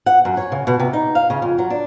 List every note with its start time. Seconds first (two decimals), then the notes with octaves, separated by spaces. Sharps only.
0.06 F#5
0.25 F#2
0.37 C#5
0.52 C#3
0.67 B2
0.80 C3
0.93 D#4
1.15 F5
1.30 C#3
1.42 F2
1.58 F#3
1.70 D4